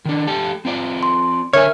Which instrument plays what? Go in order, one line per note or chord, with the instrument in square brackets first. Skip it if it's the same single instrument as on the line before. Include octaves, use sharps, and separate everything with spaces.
[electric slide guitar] D#3 D4
A3 G4 A5
C4 F4 D5
[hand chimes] C6
[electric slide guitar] D3 G#5 [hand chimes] A#4 E5 F6 [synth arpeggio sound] C#5